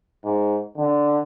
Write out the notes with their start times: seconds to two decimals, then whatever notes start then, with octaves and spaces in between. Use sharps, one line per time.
0.24 G#2
0.78 D3